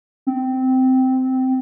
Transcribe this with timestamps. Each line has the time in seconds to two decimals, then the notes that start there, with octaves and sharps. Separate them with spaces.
0.27 C4